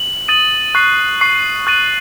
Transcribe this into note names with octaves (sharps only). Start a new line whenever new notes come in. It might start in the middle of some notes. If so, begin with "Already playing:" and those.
Already playing: F#7
D#6 A6 D#7 F#7
C#6 F#6 C7
C#6 F#6 C7
C#6 F#6 A6 D#7 F#7